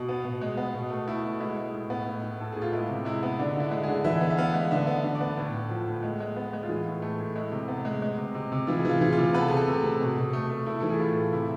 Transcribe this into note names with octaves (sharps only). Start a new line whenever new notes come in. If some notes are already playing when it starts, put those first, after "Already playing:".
Already playing: B2
B3
B2
G#3
B3
B2
A3
A3 E4
B2
G#3 E4
G#3
A2
B3
A2
A2
A2 A4
A2 G#4
F4
G#3 E4
C3
G#3 E4
B3
D3 D4
D3 E4
G#3
G#4
D3
E3 E5
B3
E5
B3 F5
G#3
D3 E5
B3
D3
D5
B3
A2
A2
F3
A2
G#3
G#3
B3
G#3
F4
E3 G#4
A2
A3
A2
G#3 E4
C3
B3
G#3
G#3
C3
C3
C3
E3 F4
G#4
E3 F4
E3 G#4
F4
C3
B3 B4
A4
C3 G#4
A4
C3
C3
B2
B2
A3
A3
A3 E4
E3 A4
G#4
A2 F4
A3
C3 E4